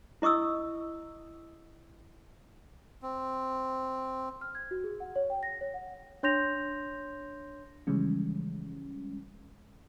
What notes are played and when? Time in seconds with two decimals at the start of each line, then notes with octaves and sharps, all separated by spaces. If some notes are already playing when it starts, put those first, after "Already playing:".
0.22 E4 D#5 C#6 D#6 E6
3.03 C4
4.41 F6
4.55 G#6
4.71 F#4
4.84 G#4
5.00 F#5
5.16 C#5
5.30 G5
5.43 A#6
5.61 C#5
5.74 F#5
6.23 D4 C#5 C6 G6 A#6 F7
7.87 C#3 E3 F3 G3 G#3 C#4